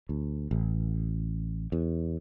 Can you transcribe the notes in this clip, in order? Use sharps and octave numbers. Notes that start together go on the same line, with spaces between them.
D2
A1
E2